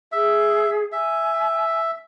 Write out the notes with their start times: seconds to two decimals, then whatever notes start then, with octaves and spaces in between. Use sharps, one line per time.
0.12 G#4 E5
0.92 E5 G#5